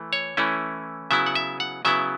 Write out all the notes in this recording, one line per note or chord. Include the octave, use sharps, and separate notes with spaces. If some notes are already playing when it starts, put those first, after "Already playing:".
Already playing: E3 A3
C#5
E3 A3 C#4 E4
C#3 F#3 B3 E4 E5
F#5
E5
F#5
C#3 F#3 B3 E4 E5